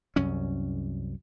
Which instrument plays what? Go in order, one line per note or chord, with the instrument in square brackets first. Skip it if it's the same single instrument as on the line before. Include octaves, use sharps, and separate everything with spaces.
[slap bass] C2 F#2 C#4